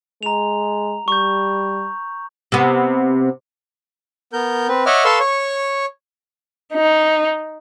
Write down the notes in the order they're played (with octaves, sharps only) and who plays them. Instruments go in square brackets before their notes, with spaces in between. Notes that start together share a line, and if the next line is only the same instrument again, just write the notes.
[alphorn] G#3 [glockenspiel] A#5 F7
[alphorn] G3 [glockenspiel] C#6 G6
[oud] C3 B3
[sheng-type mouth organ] B3 A#4 G6
C4 B4
C#5 D#5 E5 F#5 D6 F6
A4 B4 F5 C6 C#6 E6
C#5 C#6
[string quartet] D#4